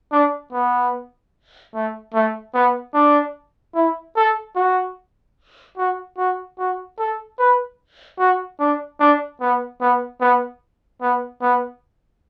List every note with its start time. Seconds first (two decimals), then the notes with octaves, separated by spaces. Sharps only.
0.12 D4
0.52 B3
1.74 A3
2.14 A3
2.54 B3
2.94 D4
3.75 E4
4.16 A4
4.56 F#4
5.77 F#4
6.18 F#4
6.58 F#4
6.99 A4
7.39 B4
8.19 F#4
8.59 D4
9.00 D4
9.41 B3
9.81 B3
10.21 B3
11.02 B3
11.41 B3